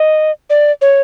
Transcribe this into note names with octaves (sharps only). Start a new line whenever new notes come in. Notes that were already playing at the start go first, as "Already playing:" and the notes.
Already playing: D#5
D5
C#5